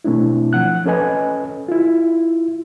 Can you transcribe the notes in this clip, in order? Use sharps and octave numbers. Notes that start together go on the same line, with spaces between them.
B2 A3 C4 D4 E4
F3 F#5 F#6
C#4 A4 B4 D#5 G#5
E4 F4